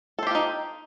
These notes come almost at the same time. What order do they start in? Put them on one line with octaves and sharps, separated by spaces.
A4 C5 G4 F4 D#4